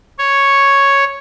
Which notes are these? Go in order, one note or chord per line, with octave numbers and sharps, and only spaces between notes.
C#5